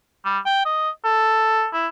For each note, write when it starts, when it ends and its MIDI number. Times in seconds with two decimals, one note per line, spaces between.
0.25 0.39 55
0.46 0.64 79
0.66 0.90 75
1.05 1.68 69
1.73 1.87 64